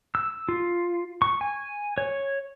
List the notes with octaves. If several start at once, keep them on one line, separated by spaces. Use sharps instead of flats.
E6
F4
C#6
G#5
C#5